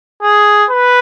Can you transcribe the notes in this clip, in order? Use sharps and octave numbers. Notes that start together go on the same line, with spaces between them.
G#4
B4